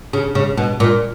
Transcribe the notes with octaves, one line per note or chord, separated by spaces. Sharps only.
C#3
C#3
B2
A#2